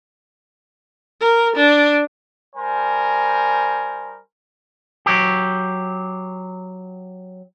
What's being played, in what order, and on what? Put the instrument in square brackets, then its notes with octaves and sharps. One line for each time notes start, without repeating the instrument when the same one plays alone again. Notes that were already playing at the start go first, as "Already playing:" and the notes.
[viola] A#4
D4
[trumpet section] G3 A#4 C5 G#5
[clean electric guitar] F#3 G4